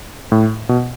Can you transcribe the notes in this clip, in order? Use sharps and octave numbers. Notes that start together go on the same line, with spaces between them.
A2
B2